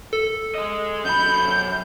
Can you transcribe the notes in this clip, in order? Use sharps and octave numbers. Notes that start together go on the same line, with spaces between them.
A4
G#4 D#5
F#2 B5 G6